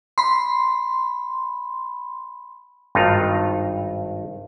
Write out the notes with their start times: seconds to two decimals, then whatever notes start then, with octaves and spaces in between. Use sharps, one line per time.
0.18 B5 C6
2.95 G#1 G2 D#4 F4 A#5